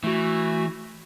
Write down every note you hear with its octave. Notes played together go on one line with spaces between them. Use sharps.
E3 A3 F#4